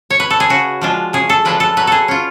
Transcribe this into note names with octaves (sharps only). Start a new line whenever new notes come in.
C#5
B4
A4
G#4
C#3 F#4
F3 G#3 D4 F4
C#3 G#4
A4
F3 G#3 D4 F4 B4
A4
F#3 B4
G#4 A4
C#4 F4